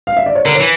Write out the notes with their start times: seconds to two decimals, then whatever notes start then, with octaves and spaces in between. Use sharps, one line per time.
0.07 F5
0.17 E5
0.26 D5
0.35 C#5
0.45 D3 A#4
0.55 C#5
0.60 E3